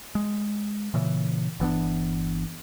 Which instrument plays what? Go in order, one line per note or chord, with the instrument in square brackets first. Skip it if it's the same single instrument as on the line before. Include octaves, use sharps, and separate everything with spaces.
[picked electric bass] G#3
A#2 C#3 E3
G1 E3 B3 D4